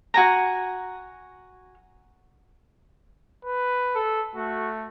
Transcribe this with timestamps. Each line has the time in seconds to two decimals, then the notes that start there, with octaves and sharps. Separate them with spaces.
0.14 F#4 G#5 A#5
3.45 B4
3.95 A4
4.36 A3 F#4